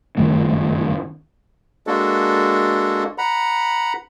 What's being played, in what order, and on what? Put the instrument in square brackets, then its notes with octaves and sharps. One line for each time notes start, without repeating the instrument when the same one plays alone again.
[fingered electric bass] F#1 G2 D#3 A3
[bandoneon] G#3 A#3 D4 F#4 A4
F#5 A#5 B5